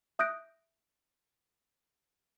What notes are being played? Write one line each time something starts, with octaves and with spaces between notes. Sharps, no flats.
E5 D#6 F#6 G6 A#6 D7